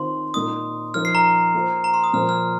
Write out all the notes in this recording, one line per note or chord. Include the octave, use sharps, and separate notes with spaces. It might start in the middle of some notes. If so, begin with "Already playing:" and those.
Already playing: D#3 C4 F4 C5 C6
A#2 A#3 D#4 D#6
F3 D#4 A#4 F6
C7
A#5
A#3 F4 C5
A#5
C6
D#6
A#2 F3 A#3 F4 C5 F6
F6